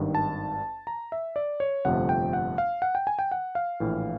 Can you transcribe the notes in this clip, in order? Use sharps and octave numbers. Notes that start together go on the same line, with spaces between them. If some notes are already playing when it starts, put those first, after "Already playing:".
Already playing: G#1 G2 D#3
A5
A#5
E5
D5
C#5
G1 F2 C3 F3 A3 F#5
G5
F#5
F5
F#5
G5
G#5
G5
F#5
F5
A#1 A2 E3